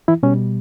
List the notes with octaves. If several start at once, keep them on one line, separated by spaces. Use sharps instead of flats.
E3 E4
B2 G3 C#4